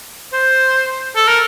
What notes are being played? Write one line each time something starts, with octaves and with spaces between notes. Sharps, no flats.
C5
A4
A#4